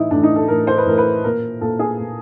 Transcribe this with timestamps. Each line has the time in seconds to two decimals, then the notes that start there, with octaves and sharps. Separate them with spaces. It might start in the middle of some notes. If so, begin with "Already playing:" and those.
Already playing: A2 E3 D#4 E4
0.11 A2 E3 D4
0.23 D#4
0.36 A4
0.48 A2 E3 A#4
0.67 C5
0.78 B4
0.86 A2 E3 A#4
0.98 B4
1.24 A#2 A#4
1.61 A#2 A4
1.79 G#4
1.99 A#2